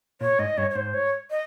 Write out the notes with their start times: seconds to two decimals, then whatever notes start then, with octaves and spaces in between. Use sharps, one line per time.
0.21 A#2 C#5
0.39 G#2 D#5
0.58 G2 C#5
0.71 C#5
0.75 G#2 C5
0.94 C#5
1.31 D#5